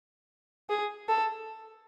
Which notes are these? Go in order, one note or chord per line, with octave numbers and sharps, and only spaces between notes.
G#4
A4